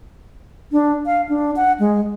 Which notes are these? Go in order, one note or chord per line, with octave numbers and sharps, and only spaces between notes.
D4
F5
D4
F#5
G#3